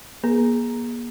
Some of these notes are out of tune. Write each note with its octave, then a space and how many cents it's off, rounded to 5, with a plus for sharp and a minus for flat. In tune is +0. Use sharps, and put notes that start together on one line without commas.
A#3 +40 G#4 +0 A#5 +0